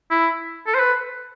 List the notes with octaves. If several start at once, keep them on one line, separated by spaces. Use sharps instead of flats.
E4
A4
C5
B4